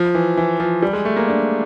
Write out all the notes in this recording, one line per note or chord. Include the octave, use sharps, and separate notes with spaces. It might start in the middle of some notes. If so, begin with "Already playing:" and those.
Already playing: F3
E3
E3
F3
G3
G#3
A3
A#3
D4